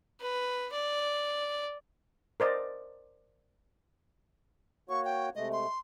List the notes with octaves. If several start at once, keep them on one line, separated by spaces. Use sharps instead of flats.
B4
D5
A#4 C5 D5 D#5
A#3 F#4 C#5 C#6
G5
C3 G#3 A3 D#5
C6